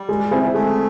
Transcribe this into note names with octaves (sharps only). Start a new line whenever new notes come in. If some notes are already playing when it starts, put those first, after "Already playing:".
Already playing: G3
G#3
C4 E4 G#4 C5
G#3 A3